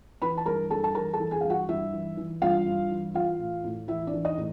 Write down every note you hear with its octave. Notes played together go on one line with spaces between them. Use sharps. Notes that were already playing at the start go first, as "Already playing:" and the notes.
E3 B4 B5
A5
G2 A#4 A#5
G2 A4 A5
A5
E3 A#4 A#5
A4 A5
E3
G#4 G#5
G2 F5
F#4 F#5
G2 E4 E5
E3
E3
G2 F4 F5
G2
E3
E3 F4 F5
A2
A2
E3 E4 E5
D4 D5
E3
D#4 D#5
A2